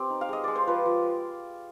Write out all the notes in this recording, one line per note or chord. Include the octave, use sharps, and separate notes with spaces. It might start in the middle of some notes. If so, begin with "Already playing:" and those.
Already playing: C4 G4
D#4
F5
G#3 D#5
G#3 D5
C5
F3 B4
F3